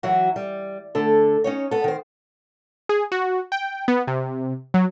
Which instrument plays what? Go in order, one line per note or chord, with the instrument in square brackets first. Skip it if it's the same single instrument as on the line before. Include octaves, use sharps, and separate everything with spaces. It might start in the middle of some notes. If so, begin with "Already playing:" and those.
[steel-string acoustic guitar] E3 F#3 E4 F#4
G3
D3 A3 A4
C#4 D#4 C#5
B3 A4
D#3 C5
[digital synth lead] G#4
F#4
G5
B3
C3
F#3